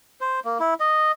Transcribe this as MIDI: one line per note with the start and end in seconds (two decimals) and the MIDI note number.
0.21 0.40 72
0.45 0.58 58
0.60 0.74 64
0.80 1.12 75